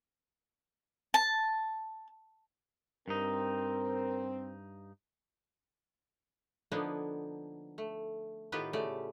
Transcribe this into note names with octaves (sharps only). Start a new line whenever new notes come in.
A5
G2 C4 D#4 A#4
D3 F3 A#3 B3 D4 D#4
A3
A2 D#3 B3 F4 G4 B4
C#3 A3 G4 D5